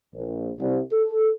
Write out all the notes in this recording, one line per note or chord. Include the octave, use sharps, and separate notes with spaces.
A#1
C2
A4